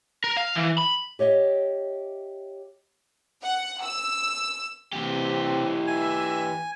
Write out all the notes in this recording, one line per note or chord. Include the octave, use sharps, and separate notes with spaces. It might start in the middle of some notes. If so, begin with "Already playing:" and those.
A#4
F5
E3
B5
G4 C#5 D#5 E5
F#5
E6
C3 E3 C4 G4
E5 G#5